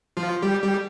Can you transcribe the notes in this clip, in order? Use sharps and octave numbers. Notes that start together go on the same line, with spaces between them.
F3 F4
G3 G4
G3 G4